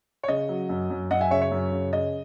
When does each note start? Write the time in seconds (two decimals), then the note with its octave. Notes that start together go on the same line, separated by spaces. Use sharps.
0.23 C#5
0.28 C#3 D#5
0.49 F#3
0.69 F#2
0.90 F#2
1.11 F#2 D#5 F#5
1.21 E5 G#5
1.31 C#3 C#5 E5
1.41 C#5
1.52 F#2
1.72 C#3
1.93 C#3 D#5